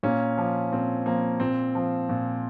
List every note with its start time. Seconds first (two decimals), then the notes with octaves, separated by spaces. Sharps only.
0.03 A#2 A#3 C#4
0.38 F3
0.72 A#2 C4
1.06 F3 A#3
1.40 A#2 C4
1.75 F3
2.09 A#2